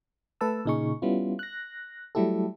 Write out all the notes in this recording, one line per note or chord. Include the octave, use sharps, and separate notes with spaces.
A3 B4 A5 E6
A#2 C#3 D#4 G#4 C#6
G3 B3 C#4 E4 F4
F#6 A#6
F#3 G3 A3 E4 G4 A4